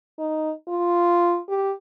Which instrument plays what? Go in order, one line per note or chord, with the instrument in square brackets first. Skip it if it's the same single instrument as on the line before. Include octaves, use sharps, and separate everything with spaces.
[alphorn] D#4
F4
G4